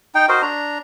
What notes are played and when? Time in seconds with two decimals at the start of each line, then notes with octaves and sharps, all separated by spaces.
0.15 D#4 G5
0.29 F#4 A#4 C5 D#5
0.42 D4 A#5